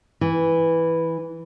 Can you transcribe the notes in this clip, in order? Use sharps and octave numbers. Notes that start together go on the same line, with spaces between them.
E3